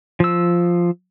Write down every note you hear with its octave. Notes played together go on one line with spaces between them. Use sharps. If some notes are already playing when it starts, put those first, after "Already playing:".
F3 E6